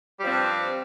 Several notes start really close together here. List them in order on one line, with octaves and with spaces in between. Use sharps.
G3 F3 C4 G2